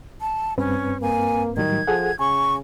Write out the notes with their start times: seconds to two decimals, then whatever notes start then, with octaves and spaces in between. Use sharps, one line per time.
0.21 A5
0.58 G2 C4 C#4 B4
1.02 A#3 G#5
1.57 A2 D#3 F#3 G3 G#6
1.87 F3 G#4 A4 F#5
2.19 C#3 G#5 C#6